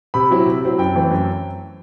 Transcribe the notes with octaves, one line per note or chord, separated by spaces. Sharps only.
C3 B5
F#3 C4 E4
C3
F#3 C4 E4
F#2 G5
E3 A3 C4 E4
F#2